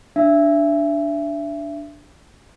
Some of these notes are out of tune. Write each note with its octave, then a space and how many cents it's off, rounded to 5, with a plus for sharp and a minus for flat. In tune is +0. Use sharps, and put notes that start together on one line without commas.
D4 +0 E5 +25